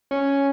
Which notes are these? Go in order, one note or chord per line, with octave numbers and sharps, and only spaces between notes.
C#4